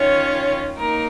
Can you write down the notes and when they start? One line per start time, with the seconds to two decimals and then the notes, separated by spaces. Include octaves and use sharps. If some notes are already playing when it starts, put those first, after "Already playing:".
Already playing: D#3 C#4 F4 C#5
0.77 A#3 D#4 A#4